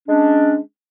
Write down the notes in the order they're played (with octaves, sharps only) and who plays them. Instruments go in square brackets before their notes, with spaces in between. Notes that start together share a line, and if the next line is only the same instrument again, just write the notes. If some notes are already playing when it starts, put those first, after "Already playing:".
[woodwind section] G#3 C#4 D4